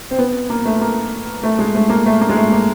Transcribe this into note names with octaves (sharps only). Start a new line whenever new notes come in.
C4
B3
A#3
A3
A#3
A3
G#3
A3
A#3
A3
A#3
G#3
A3
A#3